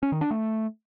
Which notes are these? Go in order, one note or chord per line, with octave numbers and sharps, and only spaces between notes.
C#4
D#3
D4
A3